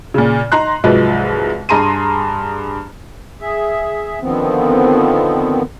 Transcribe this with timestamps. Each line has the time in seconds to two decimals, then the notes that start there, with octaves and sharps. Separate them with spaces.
0.14 A#2 C#3
0.52 D#4 A#5 C6 F#6
0.84 C2 G#2 F3 F#3 B4 D#5
1.69 G2 G#4 A#5 C6 D#7
3.41 G#4 E5
4.21 D3 D#3 F3 B3 C4